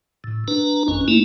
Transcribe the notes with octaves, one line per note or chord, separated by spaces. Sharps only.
A2
D4 B4 A#5
G#1 F#2 C#4
A3 A#3 D#4 E4